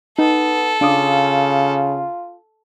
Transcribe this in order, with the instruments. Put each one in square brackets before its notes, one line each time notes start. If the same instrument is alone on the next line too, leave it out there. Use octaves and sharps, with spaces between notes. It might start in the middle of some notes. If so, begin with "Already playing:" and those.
[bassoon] B3 [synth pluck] D#4 [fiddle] A4
[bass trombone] C#3 [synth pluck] D4 D6 D#6 [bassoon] F4